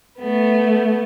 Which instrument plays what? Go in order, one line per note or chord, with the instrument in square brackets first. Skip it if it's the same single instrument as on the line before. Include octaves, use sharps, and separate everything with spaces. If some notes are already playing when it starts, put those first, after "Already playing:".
[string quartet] A3 B3